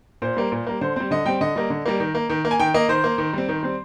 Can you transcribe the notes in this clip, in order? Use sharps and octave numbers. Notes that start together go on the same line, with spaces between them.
A#2 C5
G3 A#3
A#2
G3 A#3
D3 C5
G3 C4 C5
D3 D#5
G3 C4 G5
D3 D#5
G3 A#3
D3
G3 A#3
D#3
A#3
D#3
A#3
G#5
D#3 G5
A#3 D#5
D#3 C5
A#3
D#3
G3 C4
D#3
G3 C4